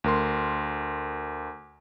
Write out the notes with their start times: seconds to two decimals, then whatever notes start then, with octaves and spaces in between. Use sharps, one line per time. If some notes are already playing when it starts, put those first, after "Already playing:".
0.04 D2 A#4 C6